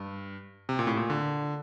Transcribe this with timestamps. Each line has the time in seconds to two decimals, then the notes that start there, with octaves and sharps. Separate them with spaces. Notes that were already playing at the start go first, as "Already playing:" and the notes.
Already playing: G2
0.69 C3
0.79 A#2
0.87 A2
0.97 A#2
1.10 D3